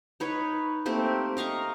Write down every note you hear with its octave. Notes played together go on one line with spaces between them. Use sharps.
D#4 B4 C#5
A3 A#3 C4 G4
D#5 F5 A#5 C#6